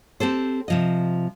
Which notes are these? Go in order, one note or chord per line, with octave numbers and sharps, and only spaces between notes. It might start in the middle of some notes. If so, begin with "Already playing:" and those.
C4 G4 A4 C5
C3 F3 D#5